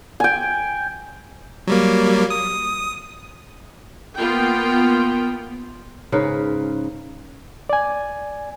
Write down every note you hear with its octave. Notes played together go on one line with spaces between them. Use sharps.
G5 G#5
F#3 G3 A#3
D#6
A#3 B3 F4 G5
G#2 C#3 A#4 B4
D5 G#5